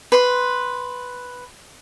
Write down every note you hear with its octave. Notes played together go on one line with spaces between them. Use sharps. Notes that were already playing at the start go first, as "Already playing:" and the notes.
B4 C6